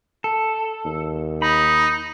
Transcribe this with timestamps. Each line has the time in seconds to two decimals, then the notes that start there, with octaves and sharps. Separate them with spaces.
0.24 A4
0.85 D#2
1.42 D#4 B5